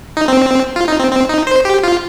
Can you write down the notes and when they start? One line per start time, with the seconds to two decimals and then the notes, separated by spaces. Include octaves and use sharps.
0.17 D#4
0.28 C4
0.76 F4
0.88 D#4
1.00 C4
1.12 C4
1.29 D#4
1.47 C5
1.65 G4
1.83 F4